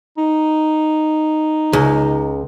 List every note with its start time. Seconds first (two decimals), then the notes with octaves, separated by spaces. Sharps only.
0.18 D#4
1.73 C#2